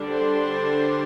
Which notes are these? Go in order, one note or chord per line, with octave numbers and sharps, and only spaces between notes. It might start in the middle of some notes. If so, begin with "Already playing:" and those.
Already playing: D3 G3 D4
C5